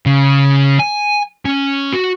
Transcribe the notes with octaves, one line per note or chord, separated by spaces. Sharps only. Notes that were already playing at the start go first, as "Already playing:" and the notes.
C#3
G#5
C#4
F#4